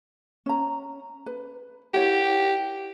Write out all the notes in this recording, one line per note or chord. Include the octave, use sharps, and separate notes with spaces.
C#4 A#5
B4
E4 G4 C#5 F#5